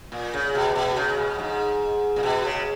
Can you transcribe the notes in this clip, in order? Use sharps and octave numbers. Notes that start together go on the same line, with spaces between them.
A#2
C#3
B2
B2
C#3
B2
G#2
A#2
B2
C#3